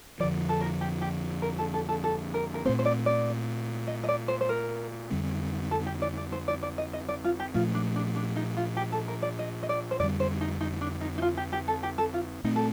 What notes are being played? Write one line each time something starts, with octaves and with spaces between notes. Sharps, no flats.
F2 D3 F3 D5
A4
A#4
G4
G4
A#4
A4
A4
A4
A4
A#4
A#4
A#2 A3 C4 C5
C5
D5
D5
D#5
D#5
D5
C5
C5
A#4
F2 D3 G3 C4
A4
G4
D5
D5
C5
D5
D5
D#5
D#5
D5
F4
G4
A#2 F3 A3 F4
D4
D4
D4
D#4
F4
G4
A4
A#4
D5
D#5
D#5
D5
C5
F2 D3 G3 D5
C5
D#4
D#4
D4
D#4
D#4
F4
G4
G4
A4
G4
A4
F4
A#2 A3 C4 D#4
A4